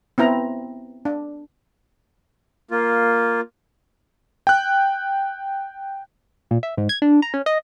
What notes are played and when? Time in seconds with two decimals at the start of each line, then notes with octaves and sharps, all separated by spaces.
0.18 B3 C4 E4 A#5
1.05 D4
2.71 A#3 F4
4.47 G5 F#6
6.51 A#2
6.63 E5
6.77 G#2
6.89 G#6
7.02 D4
7.22 A#5
7.34 C#4
7.46 D#5